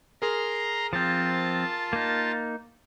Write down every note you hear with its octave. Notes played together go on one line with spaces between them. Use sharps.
G#4 A#4 A#5 C6
F3 C4 F4 A5
A#3 D#4